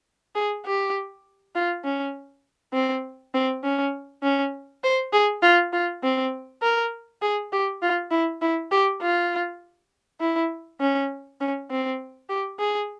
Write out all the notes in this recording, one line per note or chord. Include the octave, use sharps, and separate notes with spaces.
G#4
G4
F4
C#4
C4
C4
C#4
C#4
C5
G#4
F4
F4
C4
A#4
G#4
G4
F4
E4
E4
G4
F4
E4
C#4
C#4
C4
G4
G#4